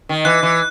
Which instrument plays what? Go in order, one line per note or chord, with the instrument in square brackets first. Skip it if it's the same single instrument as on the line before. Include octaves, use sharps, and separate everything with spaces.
[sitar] D#3
[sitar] E3 [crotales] F#6
[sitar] E3